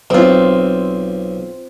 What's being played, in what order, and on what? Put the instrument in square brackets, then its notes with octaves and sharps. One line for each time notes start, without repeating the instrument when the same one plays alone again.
[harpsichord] B1 [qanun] C4 F4